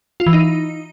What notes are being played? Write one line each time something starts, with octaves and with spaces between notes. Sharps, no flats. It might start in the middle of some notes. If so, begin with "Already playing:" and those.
F4
E3
D#4